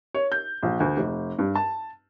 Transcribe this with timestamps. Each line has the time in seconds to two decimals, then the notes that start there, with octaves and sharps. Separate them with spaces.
0.14 C#5
0.32 G6
0.63 A#1
0.80 D2
0.97 F1
1.39 G2
1.55 A5